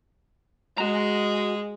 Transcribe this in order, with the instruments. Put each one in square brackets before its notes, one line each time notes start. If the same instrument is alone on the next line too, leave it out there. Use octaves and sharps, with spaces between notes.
[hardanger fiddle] G#3 [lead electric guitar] F#4 A#5